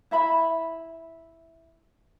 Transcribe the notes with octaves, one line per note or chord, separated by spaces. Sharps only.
E4 E5 B5